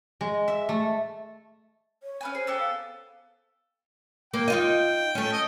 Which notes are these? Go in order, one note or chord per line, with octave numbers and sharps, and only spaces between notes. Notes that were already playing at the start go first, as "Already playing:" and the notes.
G#3
E5
A3
C#5
C#4 B4 G#5
G#4 C5
B3 G4 A4
F5
A#3 G5
D#4 F4 D#5
A3 C#4
D#5